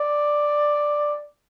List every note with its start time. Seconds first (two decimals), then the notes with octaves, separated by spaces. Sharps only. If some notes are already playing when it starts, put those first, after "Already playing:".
Already playing: D5